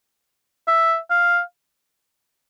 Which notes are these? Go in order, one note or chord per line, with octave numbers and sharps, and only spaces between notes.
E5
F5